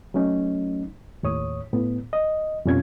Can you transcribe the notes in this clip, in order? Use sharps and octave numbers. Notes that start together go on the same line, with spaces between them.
F#3 A3 C#4 D#4
D#2 A2 C#5 D#6
A2 B3
D#5
F2 B2 G3 C#4 F4 G#6